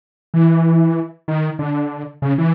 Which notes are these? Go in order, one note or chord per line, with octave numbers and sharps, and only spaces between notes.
E3
D#3
D3
C#3
E3